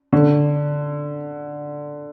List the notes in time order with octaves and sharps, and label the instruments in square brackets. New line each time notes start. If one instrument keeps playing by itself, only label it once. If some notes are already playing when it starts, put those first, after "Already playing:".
[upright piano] D3